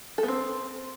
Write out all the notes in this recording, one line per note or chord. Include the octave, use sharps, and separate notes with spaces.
A4
B3
C4